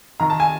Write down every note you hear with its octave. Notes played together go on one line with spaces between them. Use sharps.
D#3 A#5
A5
G#5